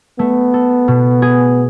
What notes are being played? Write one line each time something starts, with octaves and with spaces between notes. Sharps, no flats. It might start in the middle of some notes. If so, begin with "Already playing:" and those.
A3 B3
A4
B2
G#4